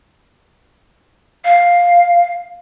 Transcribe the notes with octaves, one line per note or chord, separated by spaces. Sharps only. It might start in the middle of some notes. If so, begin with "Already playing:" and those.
F5